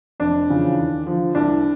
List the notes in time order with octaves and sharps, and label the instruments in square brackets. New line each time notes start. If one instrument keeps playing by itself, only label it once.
[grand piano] F1 D4
E2 C#3 F3
D#2
D3 F3
C2 D4